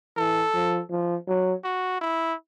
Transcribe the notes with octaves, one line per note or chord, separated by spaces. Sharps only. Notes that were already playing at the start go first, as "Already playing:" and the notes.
E3 A4
F3
F3
F#3
F#4
E4